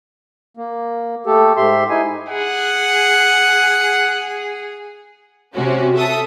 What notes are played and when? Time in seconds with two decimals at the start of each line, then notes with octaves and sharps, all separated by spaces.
0.57 A#3
1.26 A3 G4 A4
1.57 G#2 G4 E5 C6
1.89 D#4 E4 G#5
2.29 G#4 F#5
5.54 C3 C#4 F#4
5.94 A4 E5 D#6